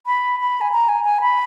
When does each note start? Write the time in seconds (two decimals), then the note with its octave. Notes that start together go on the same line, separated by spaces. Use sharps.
0.06 B5
0.40 B5
0.61 G#5
0.72 A#5
0.89 G#5
1.04 G#5
1.21 B5